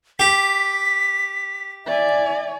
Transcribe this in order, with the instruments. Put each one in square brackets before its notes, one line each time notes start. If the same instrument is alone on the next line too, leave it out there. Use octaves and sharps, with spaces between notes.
[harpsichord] G4 [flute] B6
[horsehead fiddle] D5 G#5 [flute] E5